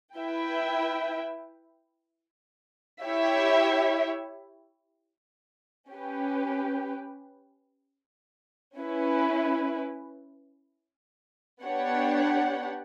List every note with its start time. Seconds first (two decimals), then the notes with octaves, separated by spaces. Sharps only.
0.17 E4 B4 E5 G5
3.03 E4 G4 C#5 E5
5.90 C#4 G4 B4
8.77 C#4 E4 B4
11.63 B3 D4 G4 C#5 F#5